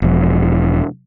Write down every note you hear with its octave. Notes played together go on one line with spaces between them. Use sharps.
E1 F3